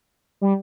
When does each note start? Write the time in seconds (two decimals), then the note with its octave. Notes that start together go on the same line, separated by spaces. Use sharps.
0.41 G3